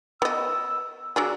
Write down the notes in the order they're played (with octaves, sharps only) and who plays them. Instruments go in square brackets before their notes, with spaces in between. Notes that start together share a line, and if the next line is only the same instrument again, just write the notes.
[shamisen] B3 D#5 [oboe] E6
[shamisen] F#3 D4 G#4 [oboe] E6